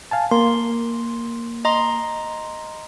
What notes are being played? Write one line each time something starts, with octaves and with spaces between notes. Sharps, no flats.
F5 G#5 A5
A#3 C6
D#5 A#5 C6